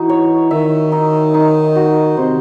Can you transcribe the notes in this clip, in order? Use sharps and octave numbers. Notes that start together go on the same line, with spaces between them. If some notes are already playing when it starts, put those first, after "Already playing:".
Already playing: E3 D#4 F#4
C#5
D#3 E5
D#4
D#4
F#4
C3 C5